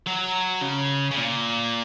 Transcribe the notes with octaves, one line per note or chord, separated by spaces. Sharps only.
F#3
C#3
C#3
A#2